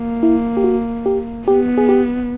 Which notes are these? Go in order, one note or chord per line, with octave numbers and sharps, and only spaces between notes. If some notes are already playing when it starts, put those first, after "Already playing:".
Already playing: A#3
E4
G4
F#4
G4
B3 G4
G#4
G4